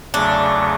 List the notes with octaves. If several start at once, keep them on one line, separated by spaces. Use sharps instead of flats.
E2 C#3 F#3 A3 D4